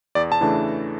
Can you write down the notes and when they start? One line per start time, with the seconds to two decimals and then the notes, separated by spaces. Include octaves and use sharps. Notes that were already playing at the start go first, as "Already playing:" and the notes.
0.15 E2 D5
0.32 A5
0.41 C#3 E3 A3 D4